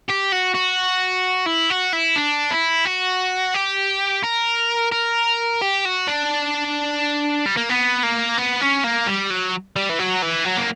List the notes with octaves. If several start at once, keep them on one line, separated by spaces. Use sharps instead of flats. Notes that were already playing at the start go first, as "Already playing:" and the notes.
G4
F#4
F#4
E4
F#4
E4
D4
E4
F#4
G4
A#4
A#4
G4
F#4
D4
G3
A#3
B3
A#3
B3
C#4
A#3
G3
F#3
G3
E3
F#3
E3
F#3
A#3